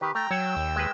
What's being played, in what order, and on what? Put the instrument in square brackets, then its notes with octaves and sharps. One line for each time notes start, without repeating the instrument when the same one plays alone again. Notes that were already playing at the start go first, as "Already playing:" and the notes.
[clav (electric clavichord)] D#3 [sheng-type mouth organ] G4 B4
[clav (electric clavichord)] A3 [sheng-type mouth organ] G5 A#5
[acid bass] F#3 [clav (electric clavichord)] C#5 [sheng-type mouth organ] G5 E6
[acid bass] D#2
[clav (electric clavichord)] G#3 B4